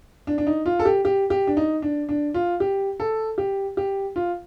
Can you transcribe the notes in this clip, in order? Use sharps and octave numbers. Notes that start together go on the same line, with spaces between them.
D4
D4
D#4
F4
A4
G4
G4
G4
D4
D#4
D4
D4
F4
G4
A4
G4
G4
F4